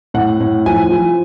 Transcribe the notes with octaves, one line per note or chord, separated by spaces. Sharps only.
A2 F#5
A2
F3 G#5
F3